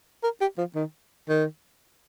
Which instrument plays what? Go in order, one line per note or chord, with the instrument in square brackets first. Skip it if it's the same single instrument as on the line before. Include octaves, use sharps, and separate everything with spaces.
[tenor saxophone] A#4
G4
F3
D#3
D#3